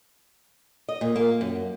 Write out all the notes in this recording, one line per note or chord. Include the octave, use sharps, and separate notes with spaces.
D#5
A#2
A#3
F#2